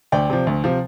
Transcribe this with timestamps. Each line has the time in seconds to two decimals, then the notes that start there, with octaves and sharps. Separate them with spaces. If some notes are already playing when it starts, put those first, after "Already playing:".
0.12 D2 D5 G5
0.30 C3 F3
0.47 D2
0.64 C3 F3